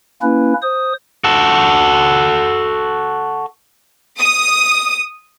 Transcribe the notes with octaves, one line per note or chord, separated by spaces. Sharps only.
A#3 C#4 E4 B4
C5 D#6
F#4 A4
D#6